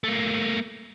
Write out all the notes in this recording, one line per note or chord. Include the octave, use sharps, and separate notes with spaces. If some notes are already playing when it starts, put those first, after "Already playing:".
A3 A#3